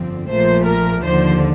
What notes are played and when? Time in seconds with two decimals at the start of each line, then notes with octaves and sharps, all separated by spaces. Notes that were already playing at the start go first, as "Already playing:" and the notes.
Already playing: G1 F2 D3 F3 C4
0.29 A#1 A#2 F3 A3 C5
0.66 A#4
1.03 D#2 D3 F3 C5